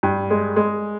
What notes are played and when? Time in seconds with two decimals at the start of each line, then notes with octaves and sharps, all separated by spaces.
0.03 G2
0.30 G#3
0.56 G#3